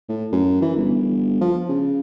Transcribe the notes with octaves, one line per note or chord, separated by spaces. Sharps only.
A2
F#2
E3
G1
F3
C#3